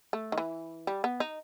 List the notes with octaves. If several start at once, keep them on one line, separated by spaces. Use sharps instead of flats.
A3
D#3
E3
G3
B3
D#4